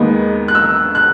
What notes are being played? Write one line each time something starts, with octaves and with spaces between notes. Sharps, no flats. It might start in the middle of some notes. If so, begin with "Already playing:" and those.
Already playing: D#2 D#3 G#3 B3
F#6
E6
F#6